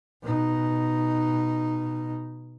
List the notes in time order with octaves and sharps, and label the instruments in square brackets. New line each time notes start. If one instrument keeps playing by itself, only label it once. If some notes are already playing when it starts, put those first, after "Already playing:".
[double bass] B2 D#4